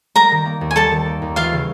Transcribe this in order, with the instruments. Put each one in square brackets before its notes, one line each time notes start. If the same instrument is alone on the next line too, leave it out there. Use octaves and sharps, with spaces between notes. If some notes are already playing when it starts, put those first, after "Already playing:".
[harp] G3 [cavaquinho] A#4 A#5
[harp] D#3
A#3
D#2
[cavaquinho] G#5
[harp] G3 [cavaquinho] A4 A5
[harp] D#3
A#3
D#2
[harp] E3 [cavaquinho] F4 F5
[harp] C#3